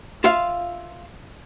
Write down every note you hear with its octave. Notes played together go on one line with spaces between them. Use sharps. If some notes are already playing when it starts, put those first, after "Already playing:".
F4 E5 F5